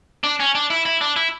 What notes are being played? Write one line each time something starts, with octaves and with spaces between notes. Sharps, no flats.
D4
C#4
D4
E4
E4
D4
E4